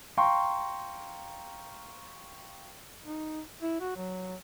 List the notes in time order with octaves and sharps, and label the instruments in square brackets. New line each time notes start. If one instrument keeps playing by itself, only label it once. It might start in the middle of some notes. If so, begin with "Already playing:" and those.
[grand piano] F5 G5 A#5 C6 C#6
[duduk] D#4
E4
F#4
F#3